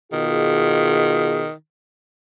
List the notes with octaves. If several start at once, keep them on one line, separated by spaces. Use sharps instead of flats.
B2 D#3 F4 G#4